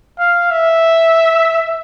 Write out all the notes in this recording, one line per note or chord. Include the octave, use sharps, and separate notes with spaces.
F5
E5